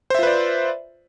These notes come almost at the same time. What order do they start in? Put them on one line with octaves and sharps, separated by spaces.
C5 E5 F4 B4 D5